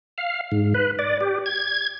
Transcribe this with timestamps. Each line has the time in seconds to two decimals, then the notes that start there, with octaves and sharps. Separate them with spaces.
0.18 F5
0.52 G#2
0.74 B4
0.99 D5
1.20 G4
1.46 G#6